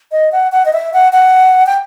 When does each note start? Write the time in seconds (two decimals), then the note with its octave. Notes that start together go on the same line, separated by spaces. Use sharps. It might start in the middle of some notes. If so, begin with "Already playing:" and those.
0.12 D#5
0.32 F#5
0.52 F#5
0.66 D#5
0.73 E5
0.93 F#5
1.13 F#5
1.66 G5